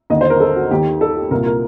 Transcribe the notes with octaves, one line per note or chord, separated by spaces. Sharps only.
D#2 D3 D#5
C5
A#4
A4
F#4
D#2 D#3 G4
A4
G4
C2 A#2 A#4
A#4